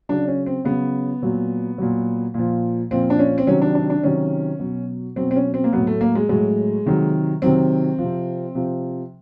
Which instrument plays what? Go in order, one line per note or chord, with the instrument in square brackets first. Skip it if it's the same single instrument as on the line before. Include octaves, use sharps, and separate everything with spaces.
[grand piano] C#3 F#3 D4
C#4
C4
C#3 F#3 B3
A#2 F#3
A#2 F#3
A#2 F3
A#2 F3 C4
D4
C#4
C4
C3 D#3 F#3 C#4
D4
D4
D4
C3 D#3 F#3 C#4
B2 F#3
B2 F#3 C4
C4
C#4
C4
A#3
A2 F#3 B3
A3
A#3
G#3
A2 F#3 G#3
C3 D#3 F#3
C3 D#3 F#3 C4
C3 F3
C3 F3